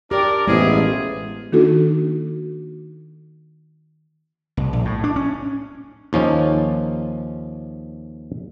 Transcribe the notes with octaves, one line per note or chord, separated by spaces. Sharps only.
D4 G4 A#4 D5
A1 F3 G#3 B3 E4 G#4
D#3 A#3 D4 D#4 F#4 A4
C2
A#1
A2
D4
C#4
D#2 F3 C#4 D#4